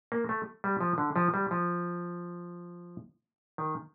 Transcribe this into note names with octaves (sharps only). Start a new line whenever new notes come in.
A#3
A3
G3
F3
D3
F3
G3
F3
D#3